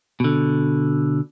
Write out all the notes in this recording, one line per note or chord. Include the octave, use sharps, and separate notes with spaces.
B2 D3